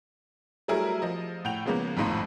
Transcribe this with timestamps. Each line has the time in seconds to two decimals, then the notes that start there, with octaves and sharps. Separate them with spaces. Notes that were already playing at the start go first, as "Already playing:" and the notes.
0.68 F#3 G3 A3 E4 G#4 A#4
1.02 F3 D#5
1.45 A2 F#5 G5 G6 F7
1.66 C#3 F3 G#3 A#3 B3
1.97 G#1 F2 A2 D#4 F4 C6